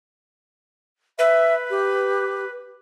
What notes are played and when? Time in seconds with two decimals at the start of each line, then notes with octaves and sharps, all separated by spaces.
1.19 B4 E5
1.70 G4